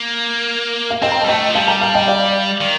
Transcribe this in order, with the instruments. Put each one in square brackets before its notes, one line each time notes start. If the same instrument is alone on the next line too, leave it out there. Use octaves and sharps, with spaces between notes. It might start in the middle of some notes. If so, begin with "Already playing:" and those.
Already playing: [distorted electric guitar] A#3
[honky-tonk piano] F5
[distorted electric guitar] C4 [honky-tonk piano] D#5 G5
[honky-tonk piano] A#5
A5
[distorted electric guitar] G3
[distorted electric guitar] A3 [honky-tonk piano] D#5 G5
[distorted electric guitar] F3
[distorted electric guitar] G3 [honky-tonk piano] F5 A5
[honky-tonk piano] G5 A#5
F5 A5
D#5 G5
D5 F5
[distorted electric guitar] D#3